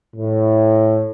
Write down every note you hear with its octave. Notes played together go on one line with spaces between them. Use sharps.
A2